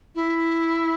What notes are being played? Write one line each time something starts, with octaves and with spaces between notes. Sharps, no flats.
E4